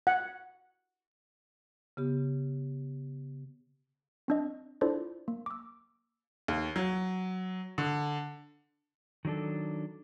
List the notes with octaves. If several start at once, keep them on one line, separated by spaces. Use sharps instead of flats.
F#5
C#3 B3 G4
C4 D4 D#5
D4 E4 F4 A4 C5 D5
A#3
D6 E6
D#2
F#3
D3
D#3 F#3 D4 A4